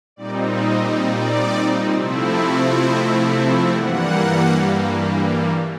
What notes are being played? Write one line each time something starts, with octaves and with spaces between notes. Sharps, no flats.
A#2 G3 C4 D#4 D5
D#5
D5
C3 F3 A3 C4 E4
D#5
E5
G2 E3 G3 A#3 F#5